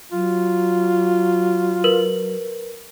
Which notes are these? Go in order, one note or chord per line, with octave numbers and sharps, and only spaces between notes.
F#3 F4
A#4 B4 F#7